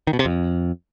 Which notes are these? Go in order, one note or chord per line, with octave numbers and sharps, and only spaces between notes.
D#3
B2
C3
F2